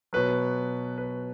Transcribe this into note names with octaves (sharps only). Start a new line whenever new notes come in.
B2 F#3 B4
B4